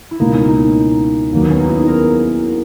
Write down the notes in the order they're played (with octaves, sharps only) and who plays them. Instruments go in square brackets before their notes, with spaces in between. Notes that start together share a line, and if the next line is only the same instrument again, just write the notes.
[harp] E4
[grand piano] C#2 B2 A#3 [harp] D#4
[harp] C#4
D#4
[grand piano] D#2 D#3 F#3 [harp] A#3
[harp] B3
C#4
D#4
E4
G#4
A#4